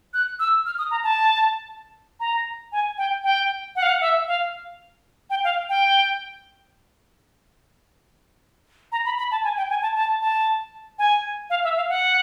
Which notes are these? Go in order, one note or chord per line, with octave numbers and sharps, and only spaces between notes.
F#6
E6
F6
D#6
A#5
A5
A#5
G#5
G5
G5
F#5
F5
F#5
E5
F5
G5
F5
G5
A#5
B5
B5
A5
G#5
G5
G#5
A5
A5
A5
G#5
F5
E5
F5
F#5